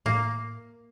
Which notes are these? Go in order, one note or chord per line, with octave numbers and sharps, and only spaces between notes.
A2 A#3